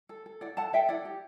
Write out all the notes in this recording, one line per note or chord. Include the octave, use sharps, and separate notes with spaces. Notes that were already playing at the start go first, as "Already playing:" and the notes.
A4
A4
E4 D5 F#5
A4 F#5 A5
A4 E5 G5
E4 D5 F#5
G4